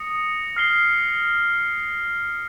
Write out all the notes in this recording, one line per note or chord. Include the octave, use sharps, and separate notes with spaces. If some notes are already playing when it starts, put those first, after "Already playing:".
Already playing: D#6 A#6 C#7
F6 C7 G7